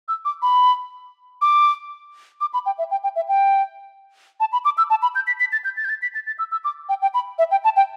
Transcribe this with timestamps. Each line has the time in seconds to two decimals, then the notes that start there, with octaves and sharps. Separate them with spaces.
0.08 E6
0.25 D6
0.42 B5
1.42 D6
2.41 D6
2.54 B5
2.66 G5
2.78 E5
2.91 G5
3.03 G5
3.16 E5
3.28 G5
4.40 A5
4.53 B5
4.65 D6
4.78 E6
4.90 A5
5.02 B5
5.15 G6
5.27 B6
5.40 B6
5.52 A6
5.64 G6
5.77 A6
5.85 G6
5.89 A6
6.02 B6
6.15 A6
6.27 A6
6.39 E6
6.52 E6
6.64 D6
6.89 G5
7.02 G5
7.14 B5
7.39 E5
7.51 G5
7.64 A5
7.76 G5